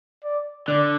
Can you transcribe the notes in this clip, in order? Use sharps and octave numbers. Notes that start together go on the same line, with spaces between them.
D5
D3 D5